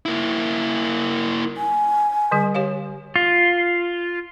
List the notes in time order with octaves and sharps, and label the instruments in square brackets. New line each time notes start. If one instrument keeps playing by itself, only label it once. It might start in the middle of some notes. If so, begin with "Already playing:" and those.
[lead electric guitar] A#3 E4
[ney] G#5
[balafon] D3 G3 G#4
G4 C#5 F5
[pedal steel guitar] F4